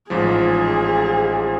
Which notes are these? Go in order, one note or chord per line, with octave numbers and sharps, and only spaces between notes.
A1 G#2 F3 G#4